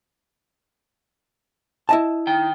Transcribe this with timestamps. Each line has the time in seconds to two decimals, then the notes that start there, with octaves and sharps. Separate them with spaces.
1.89 E4 D#5 A5
2.27 D#3 G5